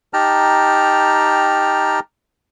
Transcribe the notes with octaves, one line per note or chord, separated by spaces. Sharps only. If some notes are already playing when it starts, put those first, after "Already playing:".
D#4 G4 G5 A5 A#5 F6